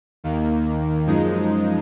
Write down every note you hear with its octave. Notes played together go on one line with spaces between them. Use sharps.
D#2 D#3 A#3
F#2 F3 G#3 D#4